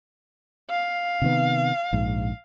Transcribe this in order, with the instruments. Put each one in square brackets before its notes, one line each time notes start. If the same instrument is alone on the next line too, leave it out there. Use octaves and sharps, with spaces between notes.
[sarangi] F5
[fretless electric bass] C3 D#3 B3
A#1 G#2